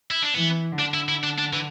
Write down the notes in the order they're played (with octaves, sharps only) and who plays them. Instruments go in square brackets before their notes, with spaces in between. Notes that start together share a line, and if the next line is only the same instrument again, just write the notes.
[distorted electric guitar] E4
D4
[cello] E3 [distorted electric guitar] B3
[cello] D3 [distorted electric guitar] D4
[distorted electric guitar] E4
E4
D4
D4
E3